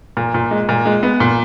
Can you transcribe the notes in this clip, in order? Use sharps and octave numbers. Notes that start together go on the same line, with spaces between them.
A#2
A#2
G#3
A#2
G#3
B3
A#2